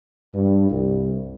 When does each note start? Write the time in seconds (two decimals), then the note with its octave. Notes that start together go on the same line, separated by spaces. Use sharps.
0.34 G2
0.70 C2